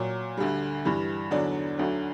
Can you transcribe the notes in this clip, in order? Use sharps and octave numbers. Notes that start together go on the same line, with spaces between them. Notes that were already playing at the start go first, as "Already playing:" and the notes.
Already playing: A#2 F#3
D2 D3 G3
G2 E3 G3
E2 D3 F#3 D5
D2 D3 F#3